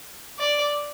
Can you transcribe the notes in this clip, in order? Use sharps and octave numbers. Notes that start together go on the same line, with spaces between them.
D5